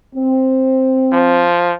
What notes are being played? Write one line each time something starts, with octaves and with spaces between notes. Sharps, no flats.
C4
F3